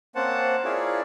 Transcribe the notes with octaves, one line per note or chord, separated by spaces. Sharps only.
A#3 C4 C#4 C5 F#5 A5
E4 F4 G#4 A#4 C#5 D5